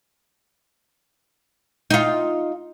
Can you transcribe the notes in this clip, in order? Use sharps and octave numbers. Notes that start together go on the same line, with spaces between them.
D#4 F4